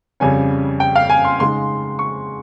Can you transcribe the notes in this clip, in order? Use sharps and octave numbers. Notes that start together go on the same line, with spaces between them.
F2 C#3 G3 C#4 G#5
G5
F5
G#5
C6
C#3 G#3 D#4 C6
C#6